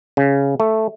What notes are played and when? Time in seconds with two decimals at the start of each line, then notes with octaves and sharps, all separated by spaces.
0.17 C#3
0.60 A3